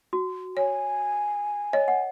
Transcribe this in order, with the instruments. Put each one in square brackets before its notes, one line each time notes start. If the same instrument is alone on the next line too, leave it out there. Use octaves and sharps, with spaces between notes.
[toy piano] F#4
[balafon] C#5 [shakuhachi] G#5
[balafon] C#5 [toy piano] D#5
[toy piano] F#5